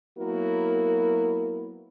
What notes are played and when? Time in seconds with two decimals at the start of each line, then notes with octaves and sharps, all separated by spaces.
0.18 F#3 A#3 B3 E4 F#4 A#4